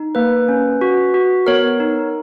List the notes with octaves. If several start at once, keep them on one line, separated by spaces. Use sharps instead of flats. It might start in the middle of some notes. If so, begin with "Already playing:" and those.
Already playing: D#4
A#3 B4
C#4
F#4
F#4
B3 A#4 C#5
D#4